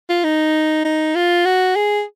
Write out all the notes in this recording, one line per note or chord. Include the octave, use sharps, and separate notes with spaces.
F4
D#4
D#4
F4
F#4
G#4